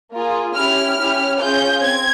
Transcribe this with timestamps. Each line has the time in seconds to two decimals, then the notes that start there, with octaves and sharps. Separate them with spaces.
0.12 A#3 F4 G#4
0.54 C#4 E4 G4 F6
0.97 C#4 E4 G4
1.39 C#4 F4 G#4 G6
1.83 C4 G#6